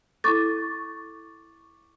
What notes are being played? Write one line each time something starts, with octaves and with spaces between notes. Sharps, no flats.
E4 A4 C#6 D6 A6